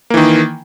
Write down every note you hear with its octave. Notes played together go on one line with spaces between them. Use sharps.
D#3 E3 A#3